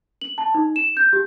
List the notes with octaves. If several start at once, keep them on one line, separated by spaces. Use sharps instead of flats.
F#7
A5
D#4
E7
G6
G4